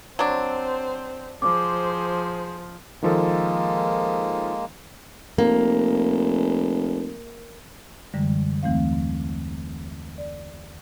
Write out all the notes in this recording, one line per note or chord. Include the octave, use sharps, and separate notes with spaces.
F#3 C4 D4 C5
F3 G#4 C5 D6
D#3 F3 G#3 A#3 A4
F1 A#3
F#2 D3 E3 G3 G#3
D#2 E3 A3 C4 F5
D5